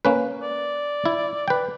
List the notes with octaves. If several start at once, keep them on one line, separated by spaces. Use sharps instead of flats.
A#3 C#4 B4
D5
E4
B4 G5